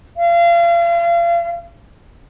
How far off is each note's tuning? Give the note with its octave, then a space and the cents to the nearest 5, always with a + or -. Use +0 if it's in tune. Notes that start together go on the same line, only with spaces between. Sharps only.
F5 -35